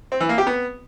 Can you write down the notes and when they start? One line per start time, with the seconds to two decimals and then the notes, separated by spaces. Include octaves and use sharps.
0.12 C4
0.20 E3
0.29 A#3
0.38 G4
0.47 B3